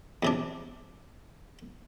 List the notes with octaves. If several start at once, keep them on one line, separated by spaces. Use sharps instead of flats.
E2 C3 D4